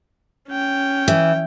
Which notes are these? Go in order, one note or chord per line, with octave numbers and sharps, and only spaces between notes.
C#4 G5
E3